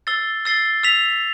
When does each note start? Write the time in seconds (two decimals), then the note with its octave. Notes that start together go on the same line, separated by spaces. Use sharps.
0.07 E6 A6 C7 G7
0.45 E6 A6 C7 G7
0.83 E6 B6 F7